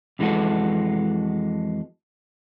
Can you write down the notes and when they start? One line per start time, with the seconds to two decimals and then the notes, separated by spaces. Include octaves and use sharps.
0.19 F2 E3 G#3 C4 F#4 A4